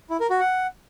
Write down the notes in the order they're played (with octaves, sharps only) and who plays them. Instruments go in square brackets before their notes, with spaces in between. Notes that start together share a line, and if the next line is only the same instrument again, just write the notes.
[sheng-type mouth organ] E4
A#4
F#4
F#5